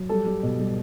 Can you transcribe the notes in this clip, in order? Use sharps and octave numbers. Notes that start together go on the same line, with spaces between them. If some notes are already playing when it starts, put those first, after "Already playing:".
Already playing: F#3
G3 A4
G3
B2
G3